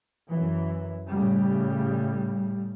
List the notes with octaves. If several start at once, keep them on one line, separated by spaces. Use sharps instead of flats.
F#2 E3
A2 C#3 G3